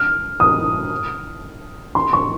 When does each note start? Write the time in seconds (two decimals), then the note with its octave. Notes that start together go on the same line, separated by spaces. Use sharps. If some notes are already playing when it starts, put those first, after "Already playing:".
Already playing: F6
0.40 D#6
1.95 C6
2.13 C#6